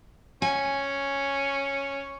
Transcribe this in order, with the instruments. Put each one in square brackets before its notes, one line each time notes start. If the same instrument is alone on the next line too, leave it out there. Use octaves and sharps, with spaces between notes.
[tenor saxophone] C#4 [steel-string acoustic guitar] G#5